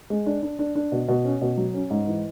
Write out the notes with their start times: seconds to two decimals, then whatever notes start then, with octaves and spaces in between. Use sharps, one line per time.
0.10 G#3
0.26 D4
0.43 D4
0.59 D4
0.75 D4
0.92 B2
1.08 B2
1.25 C#4
1.41 B2
1.58 F#3
1.74 C#4
1.90 G#2
2.07 E3